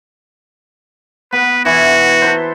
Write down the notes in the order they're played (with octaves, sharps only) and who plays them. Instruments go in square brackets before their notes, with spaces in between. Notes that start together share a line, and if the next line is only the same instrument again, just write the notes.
[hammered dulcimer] B3 [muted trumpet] B4
[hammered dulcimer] E3 E4 [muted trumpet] F#4
[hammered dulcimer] A4 B4 C5